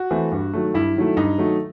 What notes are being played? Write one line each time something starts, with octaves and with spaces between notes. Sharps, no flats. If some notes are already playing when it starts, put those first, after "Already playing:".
Already playing: F#4
E3 A3 C4
G2
D#3 F#3 A3
G2 E4
D#3 F#3 A3
G2 D#4
D#3 F#3 A3